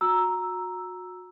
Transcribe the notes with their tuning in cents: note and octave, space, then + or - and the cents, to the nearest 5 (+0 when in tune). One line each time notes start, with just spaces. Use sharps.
F#4 -30 A#5 +0 E6 +0